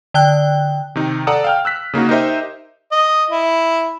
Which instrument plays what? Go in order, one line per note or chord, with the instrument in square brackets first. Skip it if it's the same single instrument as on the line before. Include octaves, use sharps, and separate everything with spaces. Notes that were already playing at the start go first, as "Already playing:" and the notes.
[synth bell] D3 G5 F#6
[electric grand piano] C3 D#3 D#4
A4 D5 F#5 A5 A#5 D#6
F5 G5 F6
E6 F#6 B6
C#3 A#3 D#4 F#4
D#4 G4 A#4 C5 D#5 E5
[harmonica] D#5
E4